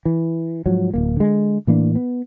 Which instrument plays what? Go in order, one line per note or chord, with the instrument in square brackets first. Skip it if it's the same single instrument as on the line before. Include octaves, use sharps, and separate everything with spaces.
[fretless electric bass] E3
G#2 F3 F#3
D1 A#3
D3 G#3
A2 E3 A#3 D4
B3